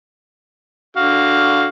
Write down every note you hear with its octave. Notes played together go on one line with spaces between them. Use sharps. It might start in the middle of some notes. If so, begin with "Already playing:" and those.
D3 F#4 F5